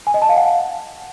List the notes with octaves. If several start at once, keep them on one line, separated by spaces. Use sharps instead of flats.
G#5
D#5
A5
F5
F#5